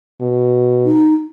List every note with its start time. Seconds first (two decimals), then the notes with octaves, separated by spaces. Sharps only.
0.21 B2
0.85 D#4